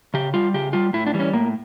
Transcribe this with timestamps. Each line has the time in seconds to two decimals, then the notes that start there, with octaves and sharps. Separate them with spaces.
0.14 C#3 G4
0.34 G3 F4
0.54 C#3 G4
0.73 G3 F4
0.93 A2 E4
1.07 D4
1.14 E3 G3
1.20 C#4
1.33 A2 A#3